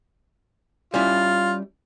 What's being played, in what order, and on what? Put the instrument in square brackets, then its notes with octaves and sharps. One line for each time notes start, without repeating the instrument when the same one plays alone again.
[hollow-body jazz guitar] G3 C#4 E4 [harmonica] F4